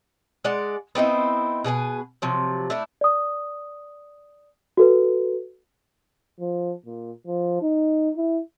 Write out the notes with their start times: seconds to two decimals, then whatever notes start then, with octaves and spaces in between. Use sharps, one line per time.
0.44 G#3 D5 F#5
0.95 B3 C4 D#4 E4
1.64 B2 G#4 B4 G#5
2.22 C3 F3 F#3
2.70 A3 D4 E4
3.01 D5 D#6
4.77 F#4 A4 B4
6.40 F3
6.86 A#2
7.27 F3
7.62 D#4
8.17 E4